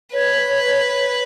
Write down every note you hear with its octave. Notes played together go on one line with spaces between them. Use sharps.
B4 C#5